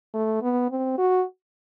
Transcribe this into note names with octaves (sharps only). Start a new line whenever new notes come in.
A3
B3
C4
F#4